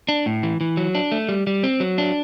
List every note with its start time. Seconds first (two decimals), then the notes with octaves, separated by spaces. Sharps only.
0.09 D4
0.26 A2
0.43 E3
0.61 E3
0.77 F#3
0.95 D4
1.12 A3
1.29 G3
1.47 G3
1.63 C4
1.80 F#3
1.98 D4